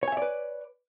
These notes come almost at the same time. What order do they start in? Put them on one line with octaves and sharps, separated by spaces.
C#5 G#5 E5 D5 B4